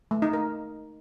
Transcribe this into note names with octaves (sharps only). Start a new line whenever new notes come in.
A3
D#4
A#4